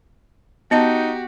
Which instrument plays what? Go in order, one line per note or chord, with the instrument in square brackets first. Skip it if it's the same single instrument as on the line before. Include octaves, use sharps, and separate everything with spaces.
[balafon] B3 D#5 A5 [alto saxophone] D#4 [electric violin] F#4 G4